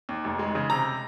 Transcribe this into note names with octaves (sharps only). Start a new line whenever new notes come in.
D#2
F1
G#3
C#3
C3 A#5